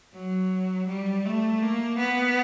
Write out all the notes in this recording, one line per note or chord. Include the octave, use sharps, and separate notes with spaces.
F#3
G3
A3
A#3
B3